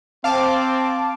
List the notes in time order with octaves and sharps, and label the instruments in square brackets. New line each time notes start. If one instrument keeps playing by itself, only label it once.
[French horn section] C4 [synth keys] F5 A5 D6